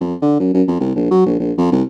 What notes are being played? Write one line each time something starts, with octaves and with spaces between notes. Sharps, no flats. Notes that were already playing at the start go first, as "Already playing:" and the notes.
F2
D3
F#2
F#2
F2
C2
A#1
F#3
A#1
A#1
F2
C2